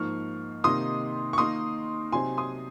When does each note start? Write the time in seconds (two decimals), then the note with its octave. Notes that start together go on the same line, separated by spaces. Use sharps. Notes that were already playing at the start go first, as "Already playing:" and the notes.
Already playing: G#2 F3 A#3 D#4 C#6 F6
0.64 C3 D#3 A#3 D#4 C6 D#6
1.33 C#6
1.38 D#3 A#3 D#4 C6 D#6
2.12 C3 F#3 C4 D#4 G#5 C6
2.37 C6 D#6